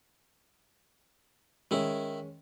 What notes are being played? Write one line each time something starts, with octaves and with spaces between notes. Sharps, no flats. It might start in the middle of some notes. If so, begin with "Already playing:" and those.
D#3 G#3 C#4 E4